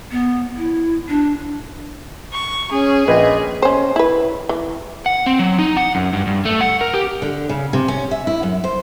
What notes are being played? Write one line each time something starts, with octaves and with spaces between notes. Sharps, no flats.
B3
E4
D4
C#6
C#4 G#4
A#1 B4 D#5
C#4 C5
E4 B4
E3
F#5
C4
F#3
D#4
F#5
F#2
G2
G2
A3
F#5
A#4
G4
D3
C#3
C3
C#4
E5
E4
F#2
C5